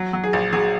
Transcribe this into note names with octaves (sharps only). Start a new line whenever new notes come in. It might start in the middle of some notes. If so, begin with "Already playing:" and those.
Already playing: F#3
F#3
G#4
A#1
F#3 G#4